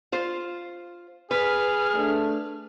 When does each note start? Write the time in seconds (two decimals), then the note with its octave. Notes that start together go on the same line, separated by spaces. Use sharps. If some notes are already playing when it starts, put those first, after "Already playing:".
0.12 F4 C5
1.31 G#4 B4 F6
1.95 A3 D4